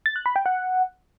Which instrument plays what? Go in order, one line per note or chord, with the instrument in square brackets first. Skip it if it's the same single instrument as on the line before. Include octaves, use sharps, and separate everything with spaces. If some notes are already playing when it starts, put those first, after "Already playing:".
[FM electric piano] A6
F#6
B5
G5
F#5